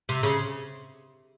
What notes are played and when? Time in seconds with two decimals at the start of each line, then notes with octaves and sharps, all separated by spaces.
0.09 C3
0.23 C#3